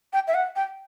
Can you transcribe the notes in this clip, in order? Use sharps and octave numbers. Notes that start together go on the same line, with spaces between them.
G5
E5
F#5
G5